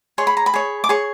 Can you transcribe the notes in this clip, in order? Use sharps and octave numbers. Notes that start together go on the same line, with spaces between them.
G#4 C#5 C6
B5
A#5
B5
G#4 C#5
D6
G#4 C#5 C#6